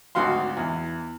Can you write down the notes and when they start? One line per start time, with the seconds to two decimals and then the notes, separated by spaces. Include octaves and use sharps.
0.15 G#1 D2 F#4 F5 C6
0.57 E2